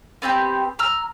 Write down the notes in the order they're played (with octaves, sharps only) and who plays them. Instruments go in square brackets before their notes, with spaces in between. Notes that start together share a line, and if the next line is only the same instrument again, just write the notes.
[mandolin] B3 C4 D#4 G4
A#5 E6 F6